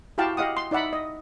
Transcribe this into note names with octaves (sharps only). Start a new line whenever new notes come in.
E4 F#4 G4 F5 G5 A5
G4 D#5 F5 F#5 D#6
C6
D#4 D5 E5 F#5 B5
D#5